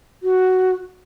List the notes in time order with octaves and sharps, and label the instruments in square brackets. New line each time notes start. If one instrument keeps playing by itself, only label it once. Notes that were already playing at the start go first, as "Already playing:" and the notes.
[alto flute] F#4